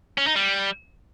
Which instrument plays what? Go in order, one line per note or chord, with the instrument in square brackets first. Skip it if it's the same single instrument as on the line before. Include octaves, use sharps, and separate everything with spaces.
[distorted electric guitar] C#4
D#4
G3